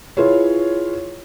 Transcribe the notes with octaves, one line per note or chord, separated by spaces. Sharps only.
E4 F4 G#4 B4 C#5